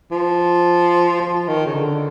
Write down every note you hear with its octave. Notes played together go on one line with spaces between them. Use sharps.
F3
F3
D#3
C#3
D3